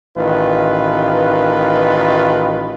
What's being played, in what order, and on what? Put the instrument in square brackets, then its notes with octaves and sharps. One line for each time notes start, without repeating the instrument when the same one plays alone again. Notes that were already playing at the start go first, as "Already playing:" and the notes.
[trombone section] A1 D#3 F4 B4